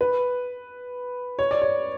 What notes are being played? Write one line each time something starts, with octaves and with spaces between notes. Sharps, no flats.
B4
C#5
D5
C#5